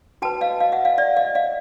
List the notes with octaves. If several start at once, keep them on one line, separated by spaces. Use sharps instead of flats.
F#4 B4 G5 A5
D#5 F5
D#5 F5
E5 F#5
D#5 F5
D5 E5
D#5 F5
D#5 F5